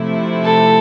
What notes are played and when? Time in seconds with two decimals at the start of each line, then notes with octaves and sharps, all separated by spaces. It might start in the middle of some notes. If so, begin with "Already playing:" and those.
Already playing: C3 F3 A3 E4
0.44 A4